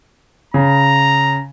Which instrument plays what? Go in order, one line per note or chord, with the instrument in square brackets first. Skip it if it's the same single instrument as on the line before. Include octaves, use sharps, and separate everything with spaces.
[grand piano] C#3 [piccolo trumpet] A#5